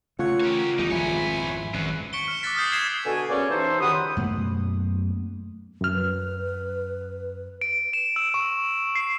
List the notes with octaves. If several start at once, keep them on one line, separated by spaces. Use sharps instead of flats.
C#3 A3 F4 C#5 F#5
G4 A#4 C#5
E2 C#3 G3 D#4
G#1 F2 G#2 E4 B4 C#5 G#5
G#1 F#2 B4
C#6 B6 C#7 D7 G7
F6 E7
D6 E6 F#6 A6 B6
D#6 F6 G6 C7
G#6 B6 C7 E7 G7
B2 D3 F#4 A4 G#5
A#3 B3 C#4 G#4 C#5 D5
E3 C#4 D#4 G4 A4 C5
C#2 F#2 D#3 F#5 B5 D#6
F#2 B2 A3 A#3
F#2 F6
B4
D7
E7
E6
C#6
C7